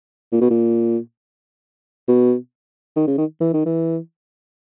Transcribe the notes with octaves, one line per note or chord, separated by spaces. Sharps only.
A#2
B2
A#2
B2
D#3
C#3
D#3
E3
D#3
E3